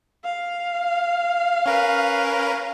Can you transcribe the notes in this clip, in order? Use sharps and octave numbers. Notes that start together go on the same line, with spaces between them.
F5
C#4 A#4 B4